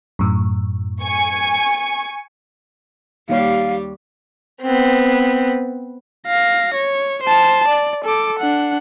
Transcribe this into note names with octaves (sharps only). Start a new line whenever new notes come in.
F#2 A2
G#5 C#6
D#2 G3 G4 C#5 F5
B3 C4
F5 A#6
C#5
C5 A5
D5
A4 D6
D4 F#5